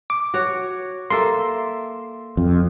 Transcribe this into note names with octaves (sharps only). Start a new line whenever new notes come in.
D6
F#4 C#5
A#3 A4 E5 C6
F2